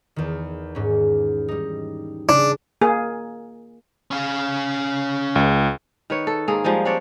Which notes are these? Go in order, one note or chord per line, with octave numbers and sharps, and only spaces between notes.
E2 D#3
G#2 C#4
G3 D#4
C#3 C#4 D4
A#3 G#4
C#4 F5
C#2
D#3 B4 C#5
A4
G#2 A#3 G#4
F3 G3 G#3 D#4
C4 D4 C#5 D5